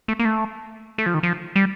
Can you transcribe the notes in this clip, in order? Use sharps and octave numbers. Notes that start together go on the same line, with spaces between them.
A3
A#3
A3
A3
F3
D#3
F3
G3